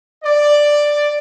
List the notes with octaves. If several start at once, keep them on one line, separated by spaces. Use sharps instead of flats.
D5